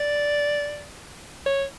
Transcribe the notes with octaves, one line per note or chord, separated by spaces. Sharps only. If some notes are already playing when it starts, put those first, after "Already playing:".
Already playing: D5
C#5